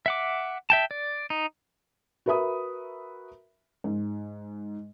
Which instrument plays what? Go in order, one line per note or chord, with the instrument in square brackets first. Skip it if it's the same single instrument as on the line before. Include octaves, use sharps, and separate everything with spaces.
[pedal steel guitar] E5 F#5 D6
E5 G5 A5
D5
D#4
[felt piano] F#4 A#4 B4 E5 B5 D#6
G#2